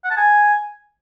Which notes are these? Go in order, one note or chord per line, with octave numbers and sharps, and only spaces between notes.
F#5
A5
G#5